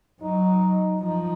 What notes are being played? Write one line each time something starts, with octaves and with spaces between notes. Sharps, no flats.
F#3 D#4
F3 D#4